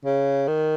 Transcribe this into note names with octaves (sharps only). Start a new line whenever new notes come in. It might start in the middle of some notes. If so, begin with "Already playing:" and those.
C#3
D#3